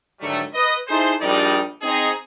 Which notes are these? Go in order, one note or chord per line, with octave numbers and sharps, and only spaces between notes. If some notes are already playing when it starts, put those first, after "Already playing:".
G#2 D3 D#3 F#3 G3 A3
B4 D#5
D#4 E4 G#4 A4 C5
A#1 G3 D#4 D5
C4 D#4 G#4